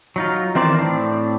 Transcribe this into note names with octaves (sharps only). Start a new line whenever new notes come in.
F#3 D#4 F4
D#3 E3 C4 A#4 C5 D5
A2 C4 D4